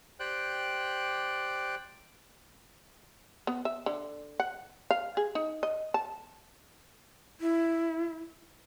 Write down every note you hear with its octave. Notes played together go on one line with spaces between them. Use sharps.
G4 C5 D5 G5 F#6
B3
E5
D3
F#5
F5
G#4
D#4
D#5
A5
E4